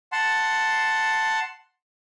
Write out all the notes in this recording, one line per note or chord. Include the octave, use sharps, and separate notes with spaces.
F#5 A5 C6